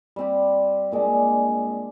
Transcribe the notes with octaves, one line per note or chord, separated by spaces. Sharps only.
G3 C4 G4
A#2 G#3 D4